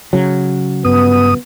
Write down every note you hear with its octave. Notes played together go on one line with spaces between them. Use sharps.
C#3 F#3
G2 B3 D#6